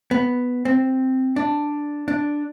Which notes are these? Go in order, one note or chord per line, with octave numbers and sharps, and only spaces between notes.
B3
C4
D4
D4